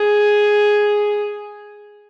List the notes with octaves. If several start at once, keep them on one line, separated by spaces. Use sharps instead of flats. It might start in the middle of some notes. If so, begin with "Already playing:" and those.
Already playing: G#4